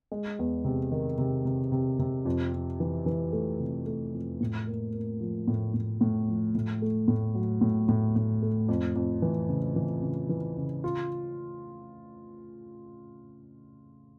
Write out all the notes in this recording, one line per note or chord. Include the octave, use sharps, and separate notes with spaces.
G#3
E2
C3
D#3
C3
C3
C3
C3
F2
F2
E3
E3
A3
C3
A3
F2
A2
A#3
A#3
F3
A2
A2
A2
F3
A2
A3
A2
F#3
A2
A2
A2
A3
F2
F2
E3
C#3
E3
C#3
E3
C#3
F4